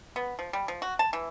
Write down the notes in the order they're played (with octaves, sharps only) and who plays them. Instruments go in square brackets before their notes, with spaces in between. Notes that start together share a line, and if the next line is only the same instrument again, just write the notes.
[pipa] B3
F3
G3
F3
F#4
A5
E3